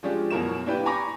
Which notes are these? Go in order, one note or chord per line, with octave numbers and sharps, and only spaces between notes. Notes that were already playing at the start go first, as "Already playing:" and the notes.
F3 G#3 C#4 D4 F4 G4
F#2 B2 E4 A#4 C#5 E7
A#3 D4 E4 G4 B4 G5
G#5 A#5 B5 C#6 D6 A#6